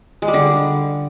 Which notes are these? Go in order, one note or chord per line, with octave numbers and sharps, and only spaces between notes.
G#3
G3
D3